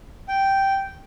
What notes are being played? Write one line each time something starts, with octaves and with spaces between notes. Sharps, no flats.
G5